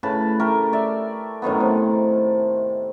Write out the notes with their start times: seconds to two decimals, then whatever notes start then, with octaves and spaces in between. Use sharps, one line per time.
0.03 A2 C#3 B4 A5
0.40 A3 G4 A#4
0.73 D5 E5
1.42 F#2 A2 D#3 B3
1.60 C3